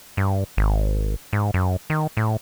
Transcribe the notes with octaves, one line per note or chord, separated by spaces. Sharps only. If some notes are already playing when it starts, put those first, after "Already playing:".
G2
G#1
G#2
F#2
D#3
A2